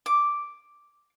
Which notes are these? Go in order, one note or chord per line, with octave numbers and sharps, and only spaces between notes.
D6